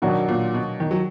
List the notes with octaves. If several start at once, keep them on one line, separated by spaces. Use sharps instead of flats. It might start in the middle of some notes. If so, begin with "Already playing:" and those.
B2 D#3 F#3 D4 F#4
A#2
B2
D#3
F#3